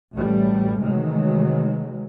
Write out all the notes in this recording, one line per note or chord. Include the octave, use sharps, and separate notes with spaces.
A1 F#2 G3 A3
C3 D#3 E3 F#3 G#3 A3